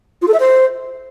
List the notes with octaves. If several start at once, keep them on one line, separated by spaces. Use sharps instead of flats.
F4
A4
E5
C5